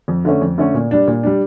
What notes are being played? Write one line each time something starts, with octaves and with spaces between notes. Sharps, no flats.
F2
D3 A3 C#4
F2
D3 A3 C#4
A#2
G3 D4
A#2
G3 D4